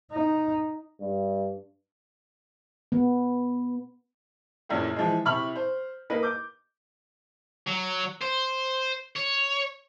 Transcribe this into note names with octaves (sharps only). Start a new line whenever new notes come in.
D#4
G2
B3
A#1 F#2 A2
E3 F3 G#3
C3 E4 B5 C#6 F6 F#7
C5
A#3 B4 D#5
D6 G6
F#3
C5
C#5